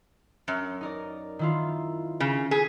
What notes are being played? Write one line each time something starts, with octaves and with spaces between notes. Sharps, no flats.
F#2
D#4 A#4 D5
D#3 E4 F4
C#3
G#4 B6